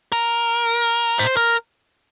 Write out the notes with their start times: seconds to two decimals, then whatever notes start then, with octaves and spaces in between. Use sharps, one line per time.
0.12 A#4
1.19 C5
1.37 A#4